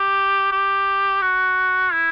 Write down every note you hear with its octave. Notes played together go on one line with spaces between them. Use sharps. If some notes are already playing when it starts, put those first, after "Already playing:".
Already playing: G4
G4
F#4
E4